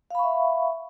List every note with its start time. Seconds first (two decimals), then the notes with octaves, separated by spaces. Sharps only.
0.11 F5
0.15 B5
0.19 C#6
0.23 E5